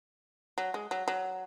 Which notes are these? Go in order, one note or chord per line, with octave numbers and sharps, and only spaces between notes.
F#3
G#3
F#3
F#3